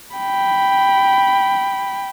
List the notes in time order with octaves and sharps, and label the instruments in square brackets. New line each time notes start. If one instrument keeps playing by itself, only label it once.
[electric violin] G5 B5